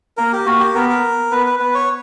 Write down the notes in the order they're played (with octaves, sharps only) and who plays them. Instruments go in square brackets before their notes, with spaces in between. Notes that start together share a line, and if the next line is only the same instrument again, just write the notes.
[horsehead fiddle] A#3 [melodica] A#4
[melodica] G4
[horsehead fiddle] A#3 [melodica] F#4
[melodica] G4
[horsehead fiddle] B3 [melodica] A#4
[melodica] A#4
[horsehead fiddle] B3 [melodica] B4
[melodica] B4
[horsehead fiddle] B3 [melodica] B4
[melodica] C#5